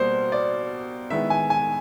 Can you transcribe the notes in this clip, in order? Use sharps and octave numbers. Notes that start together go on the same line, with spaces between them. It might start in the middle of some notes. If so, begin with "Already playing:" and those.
Already playing: B2 G3 A#3 C5
D5
D#3 G#3 B3 E4 E5
G#5
G#5